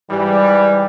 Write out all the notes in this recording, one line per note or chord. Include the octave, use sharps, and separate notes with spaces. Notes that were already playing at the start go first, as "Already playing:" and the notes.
G#2 E3 G3